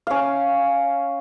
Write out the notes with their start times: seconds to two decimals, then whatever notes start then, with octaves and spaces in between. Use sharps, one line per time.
0.07 C#4 F5